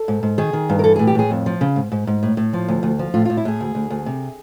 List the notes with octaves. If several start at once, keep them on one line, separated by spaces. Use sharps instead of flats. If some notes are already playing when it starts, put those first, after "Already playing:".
Already playing: A4
G#2
G#2
D#3 G#4
D#3
G2
A#4
E3 A4
A2 G#4
G4
A2 G#4
F2
F3
C#3
G#2
G#2
G#2
A2
A2
F3
D2
D2
F3
A2 F4
A2 F4
E4
A2 G#4
D2
D2
D2
C3